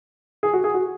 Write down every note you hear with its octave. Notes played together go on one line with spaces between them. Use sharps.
G#4
F#4
G#4
F#4